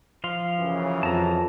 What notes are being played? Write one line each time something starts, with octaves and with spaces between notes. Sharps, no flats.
F3 F5 C6
F#2 C#3 E3
F2 A5 A#5